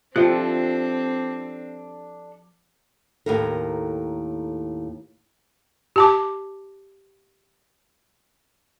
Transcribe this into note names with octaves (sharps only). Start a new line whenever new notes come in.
F3 C4 D4 G4 A4 E5 F#6
D#2 A2 E4 A4 A#4
G4 A5 D6